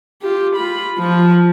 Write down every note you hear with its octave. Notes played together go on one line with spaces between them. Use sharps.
F4 G4
F4 B5
F3